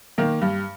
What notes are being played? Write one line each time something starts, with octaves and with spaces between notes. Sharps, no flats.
D#3 A#3
G2